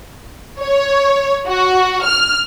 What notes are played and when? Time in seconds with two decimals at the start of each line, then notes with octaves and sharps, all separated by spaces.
0.60 C#5
1.47 F#4
2.05 F6